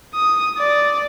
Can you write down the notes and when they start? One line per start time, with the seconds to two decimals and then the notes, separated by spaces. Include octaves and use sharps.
0.14 D#6
0.59 D5